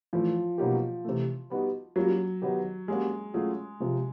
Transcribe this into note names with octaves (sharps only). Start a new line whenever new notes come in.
A2 E3 F3 A3
B2 F#3 A#3 D#4 G4
C3 E3 A3
G3 B3 D#4 F#4
F#3 G3 A#3 C#4 F4 A#4
D#3 F#3 B3 D#4 G4
G3 G#3 A#3 C#4 F#4
F#3 A3 C#4 F4 G#4
C3 F3 G#3